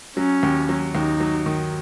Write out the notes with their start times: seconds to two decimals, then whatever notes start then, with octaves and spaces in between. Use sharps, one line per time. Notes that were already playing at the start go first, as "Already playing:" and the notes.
0.17 F#3 C#4
0.43 D#2
0.69 F#3
0.95 D#2 D#4
1.20 F#3
1.46 D#3